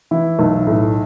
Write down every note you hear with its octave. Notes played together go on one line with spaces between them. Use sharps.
E3 E4
B1
A2